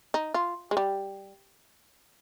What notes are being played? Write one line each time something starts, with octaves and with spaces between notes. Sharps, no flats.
D#4
F4
G#3
G3